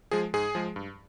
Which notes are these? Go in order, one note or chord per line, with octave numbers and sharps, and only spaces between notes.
F3 G#3 G#4
G#2 G#4
F3 G#3
G2